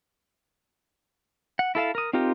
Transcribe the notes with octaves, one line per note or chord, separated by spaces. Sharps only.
F#5
E4 A4 F5 A5
A#4 D#6
C4 D#4 F4 G4 A#4